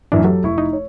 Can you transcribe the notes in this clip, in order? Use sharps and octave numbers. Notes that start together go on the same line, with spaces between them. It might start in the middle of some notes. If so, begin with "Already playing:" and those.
A1 F#2 E3 D4
F#3 G4 A4
F1 E4 C#6
D#4
C#5